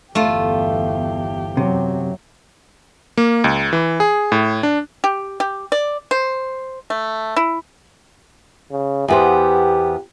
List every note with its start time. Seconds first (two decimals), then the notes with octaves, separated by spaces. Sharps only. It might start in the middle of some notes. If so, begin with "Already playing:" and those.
0.15 G1 E2 A3 F4 G4
1.57 F#2 C3 F#3
3.17 A#3
3.44 C#2
3.73 E3
4.00 G#4
4.32 A2
4.63 D4
5.04 G4
5.40 G4
5.72 D5
6.11 C5
6.90 A3
7.36 E4
8.71 C#3
9.08 E2 B3 G4 C5